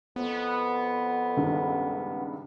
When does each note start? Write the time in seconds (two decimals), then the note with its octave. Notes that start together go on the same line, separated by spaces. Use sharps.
0.16 F2 B3
1.37 C#2 G2 D#3